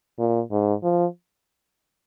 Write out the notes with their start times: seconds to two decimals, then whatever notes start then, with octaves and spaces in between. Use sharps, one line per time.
0.19 A#2
0.51 G#2
0.83 F3